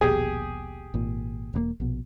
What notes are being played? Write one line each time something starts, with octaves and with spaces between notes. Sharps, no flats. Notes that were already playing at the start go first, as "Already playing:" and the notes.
D#1 A#1 B2 G4 G#4
G#1 A#2
E1 B2 A#3
A#1 B2